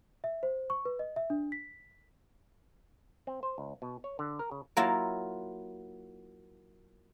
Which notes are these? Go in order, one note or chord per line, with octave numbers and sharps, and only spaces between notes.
E5
C5
C#6
B4
D#5
E5
D4
B6
C4
C5
C#2
B2
C#5
D3
A#4
C#3
F#3 A#3 E4 F4